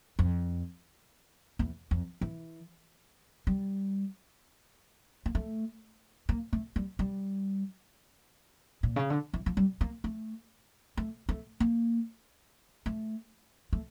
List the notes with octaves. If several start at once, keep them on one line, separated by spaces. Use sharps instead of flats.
F2
E2
F2
E3
G3
A#3
A3
A#3
A3
G3
G3
A#2
C#3
D3
E3
F3
G3
A#3
A3
A3
A3
A#3
A3
A3